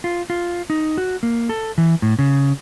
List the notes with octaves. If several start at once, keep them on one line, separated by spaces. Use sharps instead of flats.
F4
F4
D#4
F#4
A#3
A4
E3
A2
C#3